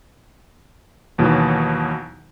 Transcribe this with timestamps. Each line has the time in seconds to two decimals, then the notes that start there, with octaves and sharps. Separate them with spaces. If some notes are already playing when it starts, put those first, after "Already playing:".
1.18 D#2 B2 E3 F#3